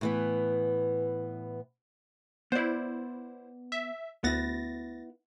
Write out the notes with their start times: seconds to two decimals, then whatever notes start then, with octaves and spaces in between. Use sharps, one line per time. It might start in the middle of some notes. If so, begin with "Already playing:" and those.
0.01 A2 E3 B3
2.52 B3 E4 C5 D5
3.72 E5
4.24 D2 B3 E4 A6 A#6